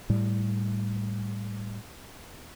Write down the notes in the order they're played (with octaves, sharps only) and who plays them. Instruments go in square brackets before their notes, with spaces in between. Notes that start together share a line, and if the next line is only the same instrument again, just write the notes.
[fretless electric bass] A2 G3